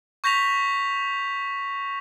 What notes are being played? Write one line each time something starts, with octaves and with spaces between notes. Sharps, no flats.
C#6 G6 A#6 B6 F7